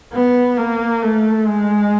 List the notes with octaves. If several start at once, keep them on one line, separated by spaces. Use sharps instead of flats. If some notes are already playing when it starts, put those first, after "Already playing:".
B3
A#3
A3
G#3